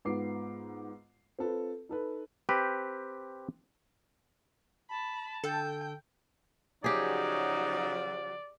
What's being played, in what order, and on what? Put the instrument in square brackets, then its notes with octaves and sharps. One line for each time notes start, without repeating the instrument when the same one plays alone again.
[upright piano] G#2 B3 F4 D6 C7
C4 F4 A4 B4
D#4 A4 B4
[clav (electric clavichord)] C4 G4 B4
[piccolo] A5 [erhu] B5
[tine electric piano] D3 E6 [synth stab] A4 [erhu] G5
[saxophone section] C#3 F3 F#3 [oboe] D#4 [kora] G4 G#4 [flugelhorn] D5